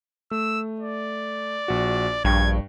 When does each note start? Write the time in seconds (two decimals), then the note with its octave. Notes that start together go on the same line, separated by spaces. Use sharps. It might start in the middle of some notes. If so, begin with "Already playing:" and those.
0.31 A3 E6
0.80 D5
1.68 A#1 F#4
2.25 A#1 G2 G5 C#6 G#6